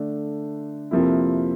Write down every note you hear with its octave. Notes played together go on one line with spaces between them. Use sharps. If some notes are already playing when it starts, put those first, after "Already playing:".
Already playing: D3 A3 D4 A4
F2 C3 F3 A#3 E4